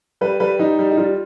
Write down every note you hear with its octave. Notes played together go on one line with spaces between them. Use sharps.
G3 B4
G3 B4
G3 D#4
G3
D#4
G3 F4